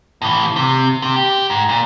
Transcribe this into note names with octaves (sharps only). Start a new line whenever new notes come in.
A2 E3
C3
C3
G4
G#2
A#2